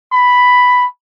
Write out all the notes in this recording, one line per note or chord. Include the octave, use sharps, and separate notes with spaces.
B5